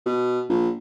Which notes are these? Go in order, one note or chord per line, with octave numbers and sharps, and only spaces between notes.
B2
A#1